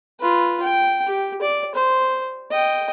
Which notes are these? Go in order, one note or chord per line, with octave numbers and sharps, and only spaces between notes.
F4 B4
G5
G4
D5
C5
D#5 G5